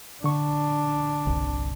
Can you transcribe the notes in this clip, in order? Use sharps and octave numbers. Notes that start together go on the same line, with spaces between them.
D3 D4 C#6
G1 C2